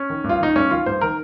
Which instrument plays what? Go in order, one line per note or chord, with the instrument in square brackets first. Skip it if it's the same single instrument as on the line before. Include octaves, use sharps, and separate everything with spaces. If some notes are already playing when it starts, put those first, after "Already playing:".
Already playing: [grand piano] C#4
D#3
G2
F4
D#3 D#4
G2 C#4
D#3 F4
G2 C5
D#3 A#4